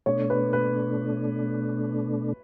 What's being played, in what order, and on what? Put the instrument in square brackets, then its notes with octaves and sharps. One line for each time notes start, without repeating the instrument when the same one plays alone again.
[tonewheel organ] B2 A3 D4 [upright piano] C#5
[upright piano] B4
B4